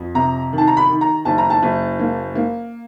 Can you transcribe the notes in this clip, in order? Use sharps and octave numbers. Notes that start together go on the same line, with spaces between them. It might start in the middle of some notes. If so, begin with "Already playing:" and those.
Already playing: F2
C3 A#5
D#3
A5
A#5
B5
D#3
A#5
F#1 A5
A#5
A5
F#1
A#3
A#3